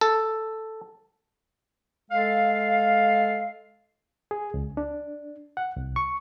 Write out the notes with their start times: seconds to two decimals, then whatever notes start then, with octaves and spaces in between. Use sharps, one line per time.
0.01 A4
2.10 G#3 A4 F5
4.31 G#4
4.54 C#2
4.77 D4
5.57 F#5
5.76 C2
5.96 C#6